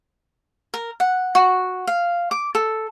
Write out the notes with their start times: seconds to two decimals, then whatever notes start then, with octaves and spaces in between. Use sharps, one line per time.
0.74 A#4
1.00 F#5
1.35 F#4
1.87 F5
2.31 D6
2.55 A4